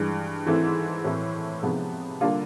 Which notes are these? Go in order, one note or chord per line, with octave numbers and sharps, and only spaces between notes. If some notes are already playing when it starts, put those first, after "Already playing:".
Already playing: G2 E3 G#3
G#2 E3 A3 C4 E4
A2 E3 A3 C4 E4
C3 F3 G#3 B3 D#4
D3 G3 A#3 D4 F4